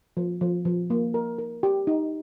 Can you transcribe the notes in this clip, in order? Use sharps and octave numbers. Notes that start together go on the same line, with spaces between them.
F3
F3
F3
A#3
A#4
A#4
G4
D#4